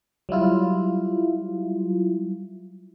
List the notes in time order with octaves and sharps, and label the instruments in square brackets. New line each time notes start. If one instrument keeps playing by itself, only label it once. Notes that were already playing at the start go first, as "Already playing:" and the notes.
[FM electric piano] F#3 G3 E4 F4